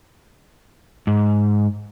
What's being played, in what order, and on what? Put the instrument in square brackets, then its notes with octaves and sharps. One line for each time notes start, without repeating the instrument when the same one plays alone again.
[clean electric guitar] G#2